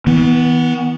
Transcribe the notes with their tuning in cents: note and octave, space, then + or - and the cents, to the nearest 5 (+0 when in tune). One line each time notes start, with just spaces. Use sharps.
E3 -40 B3 +0